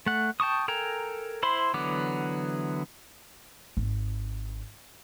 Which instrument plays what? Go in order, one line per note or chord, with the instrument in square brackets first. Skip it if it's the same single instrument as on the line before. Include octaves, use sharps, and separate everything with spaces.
[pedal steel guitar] A3 F#5
G5 A5 C#6 D#6
A4 A#4 G5 G#5 A#5
E4 C5 B5 C6
D3 E3 F#3 B3 D6
[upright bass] G#1